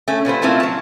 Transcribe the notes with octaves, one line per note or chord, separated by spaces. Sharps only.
A3 C#4
A#2 G3 B4 C5
A3 A#3 C4 E4 F4
F#3 A5